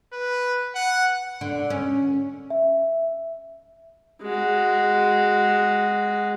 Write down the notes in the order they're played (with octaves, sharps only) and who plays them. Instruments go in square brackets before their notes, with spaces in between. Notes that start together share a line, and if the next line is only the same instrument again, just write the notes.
[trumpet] B4
F#5
[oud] D3
C#4
[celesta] E5
[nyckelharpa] G#3 F#4